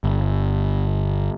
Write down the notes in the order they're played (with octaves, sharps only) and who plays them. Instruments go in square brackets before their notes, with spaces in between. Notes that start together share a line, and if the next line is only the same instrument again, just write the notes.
[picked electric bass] G1